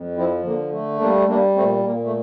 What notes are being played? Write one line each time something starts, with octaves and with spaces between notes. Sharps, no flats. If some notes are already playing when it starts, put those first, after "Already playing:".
Already playing: F2
F3 C4 E4
D3 A#3
A3
G3 A#3 D4
G3 A#3 D4
A#2 A3 C4
A#2 A#3
A3